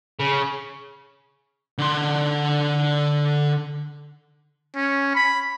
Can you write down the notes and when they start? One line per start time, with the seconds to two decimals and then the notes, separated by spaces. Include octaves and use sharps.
0.19 C#3
1.78 D3 C6
4.76 C#4
5.15 B5